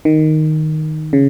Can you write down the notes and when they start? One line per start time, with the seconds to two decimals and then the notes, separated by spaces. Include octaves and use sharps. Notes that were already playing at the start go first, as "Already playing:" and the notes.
0.05 D#3
1.13 C#3